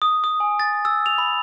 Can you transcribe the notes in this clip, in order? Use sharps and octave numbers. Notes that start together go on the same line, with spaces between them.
D#6
D#6
G#5
A6
E6
F7
B5